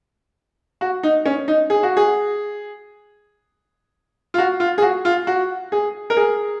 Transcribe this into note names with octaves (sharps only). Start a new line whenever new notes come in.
F#4
D#4
C#4
D#4
G#4
F#4
G#4
F4
F#4
F4
G#4
F#4
F4
F#4
G#4
A#4
G#4